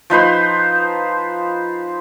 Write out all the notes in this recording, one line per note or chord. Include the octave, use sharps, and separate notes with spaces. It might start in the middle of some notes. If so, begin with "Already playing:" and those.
F3 D#4 B4 C5